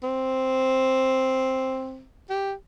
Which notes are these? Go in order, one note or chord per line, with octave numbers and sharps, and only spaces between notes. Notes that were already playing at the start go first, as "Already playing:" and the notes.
C4
G4